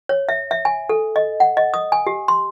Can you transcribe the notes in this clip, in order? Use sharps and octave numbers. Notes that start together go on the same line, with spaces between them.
C#5
E5
E5
G#5
A4
D#5
F#5
D#5
D#6
G#5
G4
C6